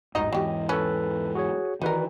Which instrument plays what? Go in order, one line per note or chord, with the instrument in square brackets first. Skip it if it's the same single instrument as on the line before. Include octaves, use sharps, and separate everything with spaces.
[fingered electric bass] A1 E2 G#2 [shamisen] D#3 F#3 D#4 [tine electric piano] D#5
[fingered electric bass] E2 G#2 E3 [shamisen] F#3 G4
[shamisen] C#4 [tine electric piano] A4 B4
[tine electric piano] F#4 G#4 C#5
[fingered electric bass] D#3 E3 [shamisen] D#4 A#4 [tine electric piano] F#4 B4 D5